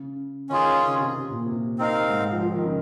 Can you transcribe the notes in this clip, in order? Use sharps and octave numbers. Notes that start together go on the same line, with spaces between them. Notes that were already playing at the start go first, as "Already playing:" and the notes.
Already playing: C#3
D#3 C#4 F4 G#4
C#3
C3
A#2
C3
C4 D#4 A#4 F5
G#2
F3
F3
D#3
C#3